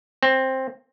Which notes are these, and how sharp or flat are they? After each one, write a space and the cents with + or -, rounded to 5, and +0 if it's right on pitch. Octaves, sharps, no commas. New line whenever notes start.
C4 +10